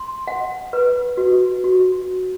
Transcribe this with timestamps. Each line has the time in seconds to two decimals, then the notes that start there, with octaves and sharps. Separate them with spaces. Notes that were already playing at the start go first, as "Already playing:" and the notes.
Already playing: C6
0.28 F#5
0.73 B4
1.17 F#4
1.64 F#4